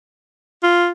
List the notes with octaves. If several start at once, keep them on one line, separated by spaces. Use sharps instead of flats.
F4